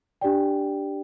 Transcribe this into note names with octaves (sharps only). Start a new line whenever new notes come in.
D4 G4 D5 G5